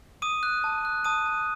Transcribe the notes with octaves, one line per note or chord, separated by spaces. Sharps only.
D6 D#6 D#7
F#6
A5
F#6
A5 D#6 D#7
A5